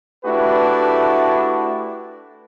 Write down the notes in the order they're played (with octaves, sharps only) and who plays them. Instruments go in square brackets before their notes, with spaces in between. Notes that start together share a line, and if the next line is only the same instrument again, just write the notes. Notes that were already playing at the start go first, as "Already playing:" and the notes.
[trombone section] A3 D4 E4 F#4 G4 B4